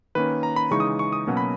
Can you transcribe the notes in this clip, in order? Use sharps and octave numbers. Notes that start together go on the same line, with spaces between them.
D#3 A#3 C#4 B4
A#5
B5
C#3 E3 G#3 D#4 C#6
D#6
C#6
D#6
B2 F#3 A#3 C#4
B5